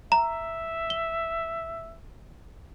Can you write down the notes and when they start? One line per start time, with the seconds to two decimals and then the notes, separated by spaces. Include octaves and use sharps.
0.12 E5 A#5
0.90 G7